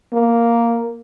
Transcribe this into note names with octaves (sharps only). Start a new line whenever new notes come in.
A#3